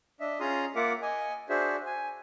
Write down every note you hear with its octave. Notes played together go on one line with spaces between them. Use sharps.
D4 D#5 E5
C#4 F4 G#4 A#5 C6 D#6
A#3 F4 A#4 E5 F#5 D6
D#5 G#5
D4 F#4 G#4 C5 E5
G#5